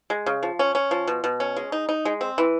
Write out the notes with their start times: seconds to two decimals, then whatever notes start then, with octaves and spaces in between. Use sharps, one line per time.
0.10 G#3
0.26 C#3
0.43 F3
0.59 C#4
0.75 C#4
0.91 F3
1.07 B2
1.24 B2
1.40 C#4
1.56 G#3
1.72 D#4
1.89 D#4
2.05 G#3
2.21 C4
2.38 E3